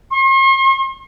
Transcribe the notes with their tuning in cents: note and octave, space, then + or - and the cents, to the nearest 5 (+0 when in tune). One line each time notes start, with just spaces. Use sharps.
C6 +45